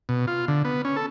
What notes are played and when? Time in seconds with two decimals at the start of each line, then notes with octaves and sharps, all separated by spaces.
0.09 B2
0.27 F4
0.48 D3
0.65 B3
0.85 C#4
0.96 A4